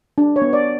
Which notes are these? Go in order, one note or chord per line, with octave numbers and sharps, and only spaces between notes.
D4
C#5
B3
D5